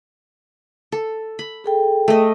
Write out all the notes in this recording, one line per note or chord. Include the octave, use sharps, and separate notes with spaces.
A4
B5
G#4 A4 G5
A3 D#5